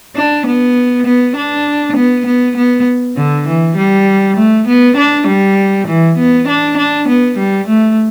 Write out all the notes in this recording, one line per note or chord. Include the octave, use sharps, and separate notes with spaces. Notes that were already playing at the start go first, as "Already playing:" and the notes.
D4
B3
B3
D4
B3
B3
B3
D3
E3
G3
A3
B3
D4
G3
E3
B3
D4
D4
B3
G3
A3